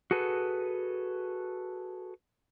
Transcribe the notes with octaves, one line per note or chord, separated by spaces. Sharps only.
F#4 G#4 A4 B4